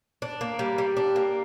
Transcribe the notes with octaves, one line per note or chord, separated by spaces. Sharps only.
D4
A#3
G3
G3
D4
A#3